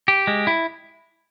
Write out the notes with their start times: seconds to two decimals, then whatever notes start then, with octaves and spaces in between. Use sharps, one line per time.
0.08 G4
0.27 G#3
0.47 E4